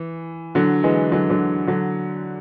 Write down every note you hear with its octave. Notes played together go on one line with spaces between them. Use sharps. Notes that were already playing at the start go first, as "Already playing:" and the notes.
Already playing: E3
D3 F#3
E3 G#3
D3 F#3
D3 F#3
D3 F#3